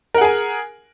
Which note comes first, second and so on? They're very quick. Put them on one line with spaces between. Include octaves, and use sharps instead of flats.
A#4 F#5 G#4 G#5